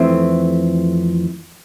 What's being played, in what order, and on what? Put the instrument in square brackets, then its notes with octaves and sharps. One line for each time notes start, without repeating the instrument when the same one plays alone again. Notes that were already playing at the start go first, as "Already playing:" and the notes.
Already playing: [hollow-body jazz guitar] F2 E3 A3 C4